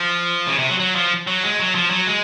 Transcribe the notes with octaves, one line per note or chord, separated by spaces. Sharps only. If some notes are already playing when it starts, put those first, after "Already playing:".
Already playing: F3
C#3
C3
F#3
F#3
F3
F#3
G#3
F#3
F3
F#3
G#3